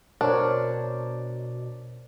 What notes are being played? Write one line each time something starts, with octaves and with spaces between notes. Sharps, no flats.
B2 D4 A#4 C5 C#5